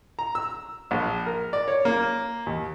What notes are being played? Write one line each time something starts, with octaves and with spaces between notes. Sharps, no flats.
A#5
E6
A#1
A#4
D5
C#5
A#3
D#2